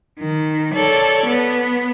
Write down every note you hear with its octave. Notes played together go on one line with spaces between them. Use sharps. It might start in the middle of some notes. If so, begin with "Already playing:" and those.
D#3
A4 C#5 D5
B3